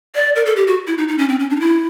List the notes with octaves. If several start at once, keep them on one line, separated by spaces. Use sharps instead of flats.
D5
A#4
A4
G4
F#4
E4
D#4
D#4
C#4
C4
C#4
D4
D#4
E4